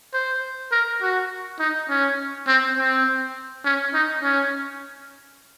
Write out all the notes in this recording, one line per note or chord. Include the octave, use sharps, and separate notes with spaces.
C5
A#4
F#4
D#4
C#4
C4
C4
C#4
D#4
C#4